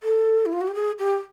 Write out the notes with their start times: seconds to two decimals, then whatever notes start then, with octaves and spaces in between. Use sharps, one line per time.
0.03 A4
0.45 E4
0.52 F4
0.61 F#4
0.67 G4
0.74 G#4
0.99 G4